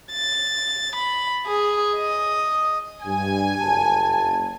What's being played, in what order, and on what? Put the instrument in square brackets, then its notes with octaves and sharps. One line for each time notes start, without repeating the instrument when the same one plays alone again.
[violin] A6
B5
G#4
D#5
[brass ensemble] G2 [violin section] G#5
[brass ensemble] F#1 A5